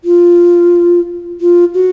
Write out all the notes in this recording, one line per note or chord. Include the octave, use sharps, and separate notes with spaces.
F4
F4
F#4